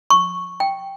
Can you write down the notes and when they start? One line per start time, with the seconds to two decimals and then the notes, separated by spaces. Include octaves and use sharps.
0.10 C#6
0.60 G5